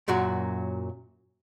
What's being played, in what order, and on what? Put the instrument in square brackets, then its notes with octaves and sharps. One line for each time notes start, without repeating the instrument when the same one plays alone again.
[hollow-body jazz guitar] F#2 A#2 F#3 F#4